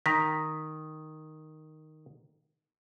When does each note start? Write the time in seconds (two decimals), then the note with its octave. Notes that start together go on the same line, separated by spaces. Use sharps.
0.06 D#3 A#5 A#6 B6